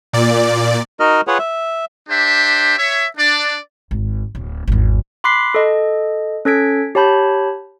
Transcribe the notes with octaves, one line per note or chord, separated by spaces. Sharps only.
A#2 D5
D#4 F#4 A#4 D#5 F6
F4 G#4 B4 C#5 F#5
E5
D4 G4 C5 E5
C#5 E5
D4 D5
G#1
D1
G#1 E2
B5 C6 D6 F#6 B6 C7
A4 D#5
C#4 A4 G#6 B6 D7
G4 C#5 A5 B5 G6